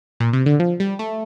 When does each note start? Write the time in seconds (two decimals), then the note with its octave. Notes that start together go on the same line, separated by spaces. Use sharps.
0.20 A#2
0.33 C3
0.46 D3
0.60 F3
0.80 G3
0.99 A3